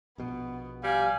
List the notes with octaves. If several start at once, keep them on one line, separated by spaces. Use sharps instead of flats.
A#1 B2 B3
G3 F5 G#5